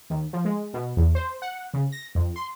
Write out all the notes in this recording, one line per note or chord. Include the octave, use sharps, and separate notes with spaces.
D#2
F3
G#3
B2
E2
C5
F#5
C#3
A#6
F2
C6